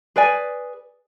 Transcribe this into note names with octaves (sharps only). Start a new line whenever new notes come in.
G#4 B4 D5 G#5